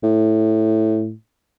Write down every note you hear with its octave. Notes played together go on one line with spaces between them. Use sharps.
A2